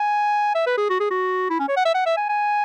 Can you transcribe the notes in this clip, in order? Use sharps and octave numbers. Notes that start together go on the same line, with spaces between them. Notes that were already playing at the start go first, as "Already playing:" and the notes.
Already playing: G#5
E5
B4
G#4
F#4
G#4
F#4
E4
C#4
C#5
F#5
E5
F#5
E5
G#5
G#5